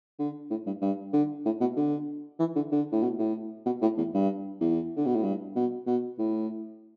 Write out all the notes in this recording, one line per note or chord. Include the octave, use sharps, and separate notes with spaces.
D3
A2
G2
G2
D3
A2
B2
D3
E3
D3
D3
A2
B2
A2
B2
A2
E2
G2
E2
D3
B2
A2
G2
B2
B2
A2